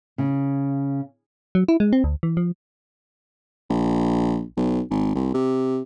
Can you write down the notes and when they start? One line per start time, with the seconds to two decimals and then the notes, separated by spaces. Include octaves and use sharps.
0.18 C#3
1.55 F#3
1.68 E4
1.80 G#3
1.93 C4
2.04 D2
2.23 E3
2.37 F3
3.70 A#1
4.57 B1
4.90 G#1
5.15 C2
5.34 C3